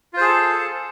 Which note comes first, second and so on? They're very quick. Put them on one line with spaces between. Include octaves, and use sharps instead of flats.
F4 C5 G#4 A5 A4